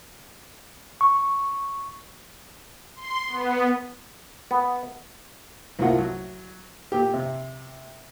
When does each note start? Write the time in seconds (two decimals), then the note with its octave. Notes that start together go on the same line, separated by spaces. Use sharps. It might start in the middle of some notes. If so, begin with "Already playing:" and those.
1.01 C#6
2.96 C6
3.28 B3
4.51 B3
5.79 C2 A2 A#3 F4 F#5
5.98 F#3
6.92 A#2 G4
7.14 C3